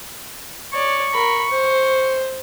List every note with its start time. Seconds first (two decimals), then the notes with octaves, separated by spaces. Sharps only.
0.73 C#5 D5 C#6
1.14 A#4 B5
1.51 C5